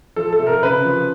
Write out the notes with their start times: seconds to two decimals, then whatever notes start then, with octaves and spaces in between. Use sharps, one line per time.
0.16 F3 A4
0.33 A4
0.39 C3
0.47 A#4
0.63 C#3 B4
0.85 F3